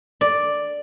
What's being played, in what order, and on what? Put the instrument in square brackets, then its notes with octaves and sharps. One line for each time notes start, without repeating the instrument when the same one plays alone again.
[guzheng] D5